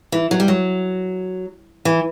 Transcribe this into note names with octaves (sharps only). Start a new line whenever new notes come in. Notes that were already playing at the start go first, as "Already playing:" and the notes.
E3
F#3
G3
F#3
E3